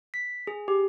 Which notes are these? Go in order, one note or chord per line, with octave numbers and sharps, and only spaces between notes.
B6
G#4
G4